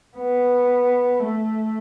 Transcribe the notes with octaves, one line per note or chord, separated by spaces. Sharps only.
B3
A3